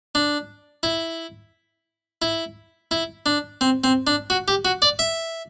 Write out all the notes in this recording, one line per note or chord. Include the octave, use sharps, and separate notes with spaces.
D4
E4
E4
E4
D4
C4
C4
D4
F#4
G4
F#4
D5
E5